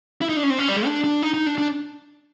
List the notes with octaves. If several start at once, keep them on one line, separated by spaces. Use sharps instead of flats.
E4
D#4
D4
C#4
C4
C#4
G3
G#3
D4
D4
D#4
D#4
D4
D4